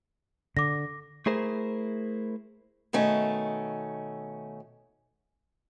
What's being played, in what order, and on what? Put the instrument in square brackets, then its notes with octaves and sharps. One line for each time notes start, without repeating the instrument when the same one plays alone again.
[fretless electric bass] D3 [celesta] D6 A#6
[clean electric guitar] A3 E4 G#4 A#4 C5
[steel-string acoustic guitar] B2 D#3 A3 C#4